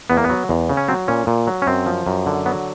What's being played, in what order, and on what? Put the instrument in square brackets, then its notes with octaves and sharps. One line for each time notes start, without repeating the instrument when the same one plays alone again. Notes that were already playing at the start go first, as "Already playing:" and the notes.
[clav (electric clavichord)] E2 B3
A#3
B3
F#3
E2
C#3
C#4
F#3 C4
A#2 C#4
A#2
F#3
C#4
F#2 C4
F3
F#2
D3
F#3 B3